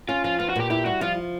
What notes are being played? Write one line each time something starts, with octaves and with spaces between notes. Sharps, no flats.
C#4 F4
F3 F4
B3 F4
F#4
A#2 G4
E4 G4
G3 F#4
F3 F4